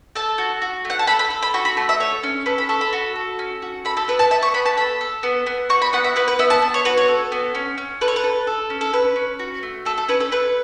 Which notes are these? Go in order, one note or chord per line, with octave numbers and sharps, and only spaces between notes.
A4 A5
F#4
F#4
A3
F#5
A5
A4 B5
B5
A4
B5
F#4 C#6
B5
A3 A5
E5
A4 C#5
C#4
A4 B4
B5
A4 C#6
B5
F#4
A4
C#4
F#4
A4 B5
A4
B3 B4
A5
B3 E5
C#6
B3 B5
A5
A4 B5
A4
B3
B3
F#4 C#6
B5
B3 F#5
E5
B3 B4
B4
B3 E5
A5
B3
C#5
F#4 B4
C#5
A4
B3
C#4
C#4
A4 B4
C#5
B4
A4
A4
C#4
A4
C#4 B4
C#4
F#4
A3
A3 A4
A4
C#4 B4
A4
A3 B4